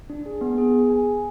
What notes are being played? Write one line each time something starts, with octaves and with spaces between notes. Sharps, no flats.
D4
G#4
B3
G#4
G#4
G#5
G#5